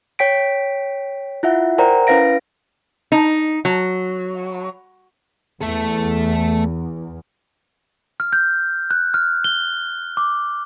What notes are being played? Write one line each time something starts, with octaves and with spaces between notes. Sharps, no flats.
C#5 G5 B6 D7
E4 F4 E5 F#5
A#4 C5 D5 F#5 G5 A#5
C#4 E4 B4 F5 A#6 D7
D#4
F#3
E2 A3 A4
F6
G6
F#6
F6
G7
D6